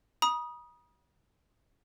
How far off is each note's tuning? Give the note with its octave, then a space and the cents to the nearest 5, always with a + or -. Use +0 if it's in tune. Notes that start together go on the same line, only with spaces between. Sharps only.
B5 -45 D#6 +0